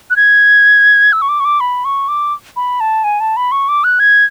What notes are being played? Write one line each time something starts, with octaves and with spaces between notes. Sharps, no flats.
F#6
G#6
E6
C#6
D6
C#6
D6
B5
C#6
D6
B5
A5
G#5
A5
B5
C#6
D6
F#6
G#6